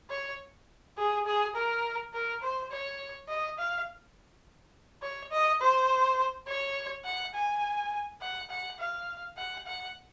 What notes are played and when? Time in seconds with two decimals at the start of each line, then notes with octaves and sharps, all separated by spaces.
0.10 C#5
0.98 G#4
1.26 G#4
1.55 A#4
2.14 A#4
2.42 C5
2.71 C#5
3.29 D#5
3.58 F5
5.02 C#5
5.31 D#5
5.61 C5
6.47 C#5
7.05 F#5
7.35 G#5
8.21 F#5
8.50 F#5
8.79 F5
9.37 F#5
9.66 F#5